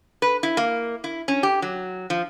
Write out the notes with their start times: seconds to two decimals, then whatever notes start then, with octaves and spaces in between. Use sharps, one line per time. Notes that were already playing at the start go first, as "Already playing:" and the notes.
0.22 B4
0.43 E4
0.57 A#3
1.04 E4
1.28 C#4
1.43 G4
1.62 F#3
2.10 F3